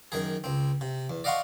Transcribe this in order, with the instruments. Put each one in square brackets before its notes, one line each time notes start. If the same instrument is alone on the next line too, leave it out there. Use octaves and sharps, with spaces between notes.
[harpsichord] F#2 D#3 G#4
C#2 C4
C3
E2
D5 D#5 F5 F#5 C6 C#6